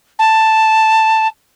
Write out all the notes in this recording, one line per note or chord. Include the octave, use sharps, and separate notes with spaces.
A5